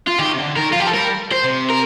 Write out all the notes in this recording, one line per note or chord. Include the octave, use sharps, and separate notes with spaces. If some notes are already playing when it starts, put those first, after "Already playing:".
F4
D#3 G4
C3
D3
D#3 A#4
F4
F3 G4
A4
G3 A#4
C5
C3
A#4